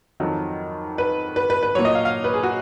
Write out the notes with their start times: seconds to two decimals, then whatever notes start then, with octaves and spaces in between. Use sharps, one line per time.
0.20 F2 D#3 F#3
0.98 B4
1.36 B4
1.50 B4
1.63 B4
1.75 A#2 F#3 C#5
1.85 D#5
1.95 F5
2.05 F5
2.24 B4
2.34 G#4
2.43 F#4